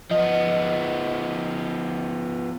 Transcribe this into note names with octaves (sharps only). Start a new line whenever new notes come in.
F3 B3 D#5